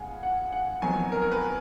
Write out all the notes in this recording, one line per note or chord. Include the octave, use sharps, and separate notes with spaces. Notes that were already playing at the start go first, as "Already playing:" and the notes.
Already playing: C#2 B2 G#3 F5 F#5 G#5
F#5
F#5
F2 D#3 F#3 B3 G#5
A#4
A#4
B4